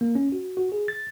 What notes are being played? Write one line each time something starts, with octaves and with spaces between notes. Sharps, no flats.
A#3
C#4
F#4
F#4
G#4
A6